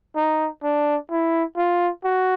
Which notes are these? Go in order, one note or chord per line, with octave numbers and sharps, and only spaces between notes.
D#4
D4
E4
F4
F#4